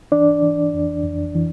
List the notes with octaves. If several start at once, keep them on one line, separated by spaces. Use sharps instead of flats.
E3 D4 D5
E3
F2
F2
E3